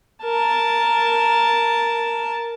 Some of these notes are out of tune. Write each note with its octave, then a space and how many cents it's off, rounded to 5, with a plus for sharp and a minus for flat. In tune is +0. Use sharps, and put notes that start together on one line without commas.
A#4 +0 A5 +0